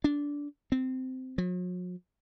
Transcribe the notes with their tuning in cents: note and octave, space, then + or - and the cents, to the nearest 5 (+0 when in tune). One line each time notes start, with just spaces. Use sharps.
D4 -15
C4 -15
F#3 -45